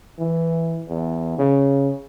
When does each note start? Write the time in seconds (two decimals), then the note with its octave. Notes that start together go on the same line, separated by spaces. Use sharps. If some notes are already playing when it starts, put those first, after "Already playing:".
0.18 E3
0.89 E2
1.38 C#3